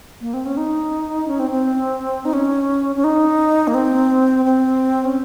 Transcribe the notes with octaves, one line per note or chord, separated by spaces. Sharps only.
A#3
C4
C#4
D#4
C#4
C4
C4
D#4
C#4
C#4
D#4
A#3
C4
C4
C#4